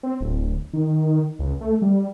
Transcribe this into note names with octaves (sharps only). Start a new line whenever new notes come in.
C4
D1
D#3
C#2
A3
G3